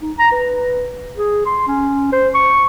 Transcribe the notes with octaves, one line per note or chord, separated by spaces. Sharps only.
D#4
A#5
B4
G#4
C6
C#4
C5
C#6